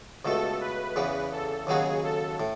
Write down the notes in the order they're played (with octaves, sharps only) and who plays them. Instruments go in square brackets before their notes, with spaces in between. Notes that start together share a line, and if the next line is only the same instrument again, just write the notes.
[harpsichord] C#2 B2 A3 [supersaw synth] A4
[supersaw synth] B4
[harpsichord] E2 C#3 E3 B3
[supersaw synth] A4
[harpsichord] D#2 C#3 F#3 B3 F#4 [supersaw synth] G#4
[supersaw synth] A4
[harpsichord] A2